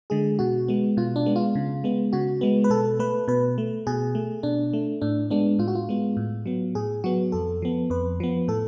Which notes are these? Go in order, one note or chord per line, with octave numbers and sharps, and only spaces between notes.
D3 G#3 G#4
B2 F#4
G#3 B3
B2 F4
D4
G#3 B3
F4
C#3
G#3 B3
C#3 F#4
G#3 B3
B4
B2 A4
A3 B4
B2 B4
A3
B2 G#4
A3
B2 D4
A3
A2 D4
G#3 B3 D4
A2 F4
F#4
F4
G#3 B3
A2
F#3 B3
A2 G#4
F#3 B3 F#4
F2 A4
F3 B3
F2 B4
F3 B3
A2 A4